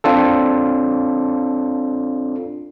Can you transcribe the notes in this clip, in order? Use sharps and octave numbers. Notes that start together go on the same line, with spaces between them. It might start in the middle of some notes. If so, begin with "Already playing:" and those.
C4 D4 F4 A4